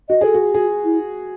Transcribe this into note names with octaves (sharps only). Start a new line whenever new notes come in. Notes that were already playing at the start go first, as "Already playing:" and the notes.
F#4 D#5
G#4 A4
F#4 G#4
F#4 G#4
E4